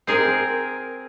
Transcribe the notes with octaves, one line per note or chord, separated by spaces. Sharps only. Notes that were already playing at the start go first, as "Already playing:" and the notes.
C4 G#4 A#4